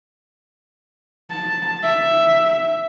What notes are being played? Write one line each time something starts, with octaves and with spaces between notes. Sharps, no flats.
A5
E5